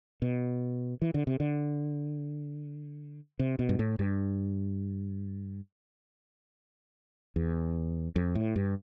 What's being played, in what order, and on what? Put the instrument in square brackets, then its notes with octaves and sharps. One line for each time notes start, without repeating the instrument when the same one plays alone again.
[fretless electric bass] B2
E3
D3
C3
D3
C3
B2
G2
A2
G2
E2
F2
A2
G2